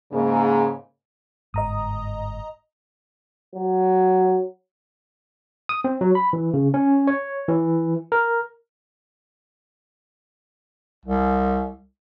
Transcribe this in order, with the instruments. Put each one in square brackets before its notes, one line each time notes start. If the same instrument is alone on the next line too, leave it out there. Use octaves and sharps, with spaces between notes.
[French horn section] G#2 C#3 A#3
[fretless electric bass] G1 G#2 [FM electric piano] D#5 A#5 D#6
[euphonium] F#3
[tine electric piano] D#6
C4
F#3
B5
E3
C#3
C#4
C#5
E3
A#4
[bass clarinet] C2